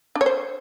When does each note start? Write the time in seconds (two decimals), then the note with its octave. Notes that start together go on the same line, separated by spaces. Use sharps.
0.15 D4
0.21 C#5
0.26 C5